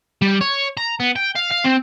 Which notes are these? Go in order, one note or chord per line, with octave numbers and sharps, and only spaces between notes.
G3
C#5
A#5
B3
G5
F5
F5
C4